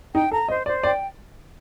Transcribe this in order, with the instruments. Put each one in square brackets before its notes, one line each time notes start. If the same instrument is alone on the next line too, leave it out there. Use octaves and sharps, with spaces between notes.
[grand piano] D#4 [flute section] G5
[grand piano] A4 [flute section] A#5
[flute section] C5 [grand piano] D#5
[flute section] C5 [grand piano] D5
[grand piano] D5 [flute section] G5